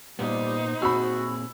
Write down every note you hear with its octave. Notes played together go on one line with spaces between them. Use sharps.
A#2 F3 G3 B3 D#4 G4 C5
A#2 C4 F#4 G#4 B5 E6